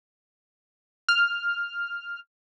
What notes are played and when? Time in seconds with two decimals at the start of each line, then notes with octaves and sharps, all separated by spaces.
1.09 F6